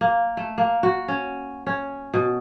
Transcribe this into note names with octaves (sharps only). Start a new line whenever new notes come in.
A#3
A3
A#3
F#4
C#4
C#4
B2